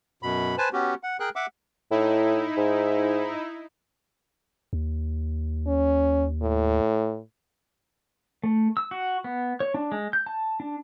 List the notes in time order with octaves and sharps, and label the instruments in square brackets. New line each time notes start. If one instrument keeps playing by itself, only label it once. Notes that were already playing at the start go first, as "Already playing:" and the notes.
[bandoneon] F#2 B2 B5
B4 C5 G#5 A5
B3 C#4 F#4 G4
F#5
G#4 A#4 G5 F#6
E5 F#5 D6
[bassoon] A2 [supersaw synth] D#4 E4
[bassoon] G#2
[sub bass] D#2
[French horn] C#4
A2
[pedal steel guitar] A3
E6
F#4
B3
C#5
D4
G#3
G6
A5
D4